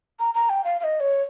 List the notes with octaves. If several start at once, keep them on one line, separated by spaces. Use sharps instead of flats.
A#5
A#5
G5
F5
F5
D#5
C#5